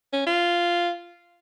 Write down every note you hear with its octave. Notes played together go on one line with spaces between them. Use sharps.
C#4
F4